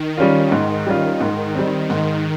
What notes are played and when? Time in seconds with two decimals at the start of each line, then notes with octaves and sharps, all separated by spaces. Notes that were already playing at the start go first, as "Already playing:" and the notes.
Already playing: D#3
0.17 G3 C#4 F4
0.52 G#2
0.87 G3 C#4 F4
1.21 G#2
1.55 G3 C4
1.90 G#2 D#3